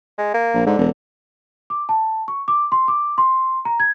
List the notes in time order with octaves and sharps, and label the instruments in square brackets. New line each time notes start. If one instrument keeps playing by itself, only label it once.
[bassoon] G#3
A#3
[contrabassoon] A#1
[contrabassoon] G#2 [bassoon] D3
[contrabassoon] E1
[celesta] D6
A5
C#6
D6
C6
D6
C6
A#5
G#6